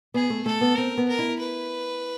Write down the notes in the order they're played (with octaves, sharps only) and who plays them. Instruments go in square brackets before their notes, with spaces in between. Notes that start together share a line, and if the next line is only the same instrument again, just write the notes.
[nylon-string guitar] B3 [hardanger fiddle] G#4
[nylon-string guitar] A3
[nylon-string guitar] A3 [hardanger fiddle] A4
[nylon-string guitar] B3
[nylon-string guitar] C4 [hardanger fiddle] A#4
[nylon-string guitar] B3
[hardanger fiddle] A#4
[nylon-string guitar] E4
[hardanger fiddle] B4